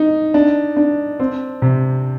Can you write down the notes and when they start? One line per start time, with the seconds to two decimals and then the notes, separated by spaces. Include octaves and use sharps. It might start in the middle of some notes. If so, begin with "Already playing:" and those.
Already playing: D#4
0.34 D4
0.76 D4
1.20 C4
1.62 C3